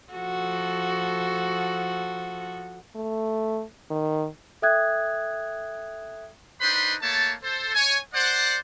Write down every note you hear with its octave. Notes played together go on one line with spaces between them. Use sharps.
F3 F#4 A4
A3
D#3
A4 E5 G5 D#6 F#6 G#6
D4 D#4 B4 C5 B5 C6
A3 A#3 C#5 A5
A4 C5
C#5 G#5
C5 D5 F#5